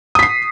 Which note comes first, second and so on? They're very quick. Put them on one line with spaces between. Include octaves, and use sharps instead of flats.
D#6 B6 C7